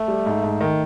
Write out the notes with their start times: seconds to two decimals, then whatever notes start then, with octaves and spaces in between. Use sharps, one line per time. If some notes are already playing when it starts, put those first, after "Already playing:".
Already playing: A3
0.08 G3
0.26 G#2
0.44 G#2
0.61 D#3